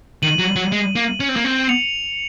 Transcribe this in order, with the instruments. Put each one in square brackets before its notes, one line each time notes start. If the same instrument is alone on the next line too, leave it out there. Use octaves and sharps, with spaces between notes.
[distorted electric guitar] D#3 [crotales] D#7 F#7
[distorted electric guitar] F#3
F#3
G#3
A#3
C#4
C4
A#3
C4
[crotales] C#7 F7